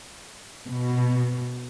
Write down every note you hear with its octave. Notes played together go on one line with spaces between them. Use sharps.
B2